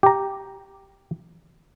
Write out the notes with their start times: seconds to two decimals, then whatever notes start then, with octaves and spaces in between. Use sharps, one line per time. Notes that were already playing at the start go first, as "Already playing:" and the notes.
0.03 G4 A#5